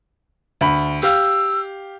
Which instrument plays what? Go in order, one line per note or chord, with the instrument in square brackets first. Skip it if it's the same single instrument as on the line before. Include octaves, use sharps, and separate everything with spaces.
[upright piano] D2 B5
[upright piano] G4 F5 [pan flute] E6